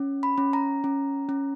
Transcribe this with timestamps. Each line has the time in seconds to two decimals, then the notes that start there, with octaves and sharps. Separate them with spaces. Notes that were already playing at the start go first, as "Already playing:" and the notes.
Already playing: C#4
0.23 B5
0.38 C#4
0.53 A#5
0.84 C#4
1.29 C#4